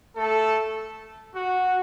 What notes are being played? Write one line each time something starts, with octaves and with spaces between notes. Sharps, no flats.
A3 A4
F#4